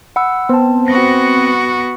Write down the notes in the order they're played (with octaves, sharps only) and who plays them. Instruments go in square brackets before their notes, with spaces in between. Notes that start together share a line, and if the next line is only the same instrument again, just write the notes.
[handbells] F#5 B5 E6
[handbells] B3 A5 [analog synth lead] C4
[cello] B3 F#4 [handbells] A#6